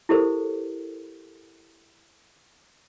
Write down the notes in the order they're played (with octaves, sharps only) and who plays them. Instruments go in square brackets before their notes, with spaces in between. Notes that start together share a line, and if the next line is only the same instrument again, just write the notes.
[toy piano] E4 G4 A4 A#4 C5